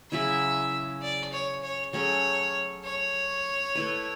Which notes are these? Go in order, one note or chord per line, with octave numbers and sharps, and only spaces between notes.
C#3 F#3 C#4 E4 E5
D5
C#5
C#5
F#3 A3 C#4 G#4 C#5
C#5
A3 E4 B4